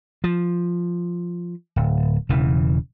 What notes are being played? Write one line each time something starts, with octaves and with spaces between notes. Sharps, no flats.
F3
D1
E1 C#3 E3